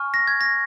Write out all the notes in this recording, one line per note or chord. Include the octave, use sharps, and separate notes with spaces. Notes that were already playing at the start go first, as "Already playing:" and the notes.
Already playing: G#5 C#6 F6
A#6
G#6
A#6